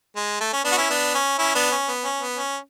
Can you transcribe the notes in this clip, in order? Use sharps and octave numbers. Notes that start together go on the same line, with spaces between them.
G#3
A3
C#4
B3 D4
F#4
C#4 E4
B3 D4
C#4
C#4 E4
B3 D4
C#4
B3
C#4
B3
C#4